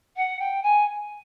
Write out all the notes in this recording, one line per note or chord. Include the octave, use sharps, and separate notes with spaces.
F#5
G5
G#5